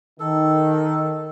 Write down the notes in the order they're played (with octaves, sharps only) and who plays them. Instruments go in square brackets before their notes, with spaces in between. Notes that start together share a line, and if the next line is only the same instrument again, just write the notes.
[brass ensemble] D#3 [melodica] A4